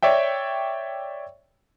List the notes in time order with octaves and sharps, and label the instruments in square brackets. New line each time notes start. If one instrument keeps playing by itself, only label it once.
[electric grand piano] C#5 D5 E5 G5